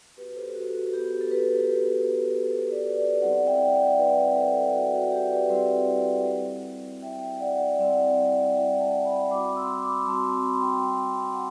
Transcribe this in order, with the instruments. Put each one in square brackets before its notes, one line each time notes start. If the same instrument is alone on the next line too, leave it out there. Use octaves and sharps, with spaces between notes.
[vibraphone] B3 F#4 G4 B4
A4 C5
F#4 A4
F#4
B3 F#4 G4
A4
G4 B4
B3 F#4
B3 A4 C5
F#4
B4 D5
B4 D5
G3 C4 E4 D5 F#5
E5 G5
D5 F#5
E5
G3 C4 E4 B4 D5
A4 C5
G3 C4 E4 F#4
F#4
G4
B4 D5
G3 C4 E4
G3 C4 E4
G3 C4 E4 E5 G5
D5 F#5
G3 C4 E4 D5 F#5
G3 C4 E4 E5 G5
F#5 A5
G5 B5
G3 C4 F#4 B5 D6
C6 E6
B5 D6
G3 C4 F#4 A5 C6
B5
C6
G5 B5
G3 C4 F#4 B5 D6
G5 B5
F#5 A5